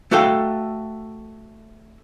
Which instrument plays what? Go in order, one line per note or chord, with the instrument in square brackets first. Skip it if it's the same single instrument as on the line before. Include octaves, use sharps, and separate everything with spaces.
[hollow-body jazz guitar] A3 F#4 A4 F5 G5